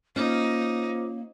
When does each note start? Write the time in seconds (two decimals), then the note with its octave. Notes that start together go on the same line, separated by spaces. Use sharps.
0.16 A#3 C#4 D#4 F4 C5 D6